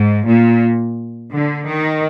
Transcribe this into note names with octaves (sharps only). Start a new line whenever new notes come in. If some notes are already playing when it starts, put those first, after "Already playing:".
Already playing: G#2
A#2
D3
D#3